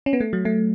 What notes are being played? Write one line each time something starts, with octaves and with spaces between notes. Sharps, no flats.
C#4
B3
A3
F#3
A3